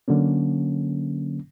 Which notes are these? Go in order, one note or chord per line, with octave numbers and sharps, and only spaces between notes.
D3 F#3 A#3 C#4